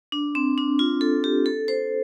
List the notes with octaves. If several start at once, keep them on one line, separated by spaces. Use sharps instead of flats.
D4
C4
D4
F4
A4
G4
A4
C5